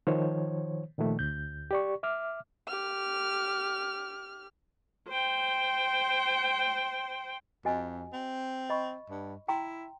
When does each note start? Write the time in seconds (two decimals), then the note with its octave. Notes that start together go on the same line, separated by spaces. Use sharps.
0.07 D#3 F3 C5 C#5
0.98 A#2 D#3 F3 A3
1.19 D2 G6
1.71 G4 D5 C#6
2.03 E5 D6 F6
2.68 G4 F6
5.08 C5 G5
7.65 F2 F#4 D#5 G#5
8.13 C4
8.70 D#5 B5 C#6
9.10 G2
9.48 E4 G5 A#5 C6